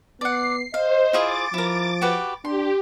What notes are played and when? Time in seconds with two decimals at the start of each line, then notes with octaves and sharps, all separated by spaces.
0.21 B3 D5 F#5 C7
0.74 C5 D#5 F5
1.13 E4 F4 G#4 D6 A6
1.54 F3 E4 A#4
2.02 F#4 G4 B4
2.45 D4 G4 C6